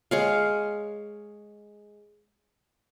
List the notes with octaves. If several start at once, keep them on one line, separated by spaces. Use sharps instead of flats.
G#3 C#5 F5